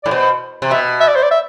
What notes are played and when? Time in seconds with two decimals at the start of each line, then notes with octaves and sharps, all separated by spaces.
0.04 A2 D5
0.11 B2 C5
0.62 C3
0.71 B2 E5
1.00 E5
1.08 D5
1.16 C5
1.23 D5
1.31 E5